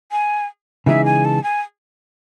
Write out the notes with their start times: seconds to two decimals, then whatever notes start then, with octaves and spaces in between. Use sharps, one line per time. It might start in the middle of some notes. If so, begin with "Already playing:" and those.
0.12 G#5
0.86 C#3 E3 G#3 D#4 G#4 E5
1.05 G#5
1.25 A5
1.44 G#5